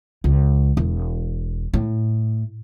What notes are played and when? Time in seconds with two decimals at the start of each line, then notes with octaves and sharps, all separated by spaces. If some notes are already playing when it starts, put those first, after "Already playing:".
0.24 C#2
0.77 E1
1.74 A2